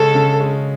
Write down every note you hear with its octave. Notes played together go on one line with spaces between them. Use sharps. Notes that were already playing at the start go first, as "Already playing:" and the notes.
Already playing: C#3 G#3 C#4 A4
C#3
G#3 C#4